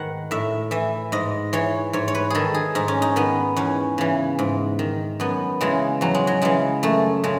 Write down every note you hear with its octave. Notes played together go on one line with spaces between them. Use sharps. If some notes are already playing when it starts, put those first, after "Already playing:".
Already playing: G#2 D#3 B4 F#5
A2 E5
E3 E5
G#2 D#5
E3 C#5
G#2 C#5
C#5
B4
D#3 G#4 A4
G#4
G#2 D#4
C#4
D#4
D#3 B3
E2 C#4
C#3 E3
G#2
D#3
F#2 B3
C#3 E3 G#3
E2 F#3
G#3
F#3
C#3 E3 G#3
F#2 A3
C#3 G#3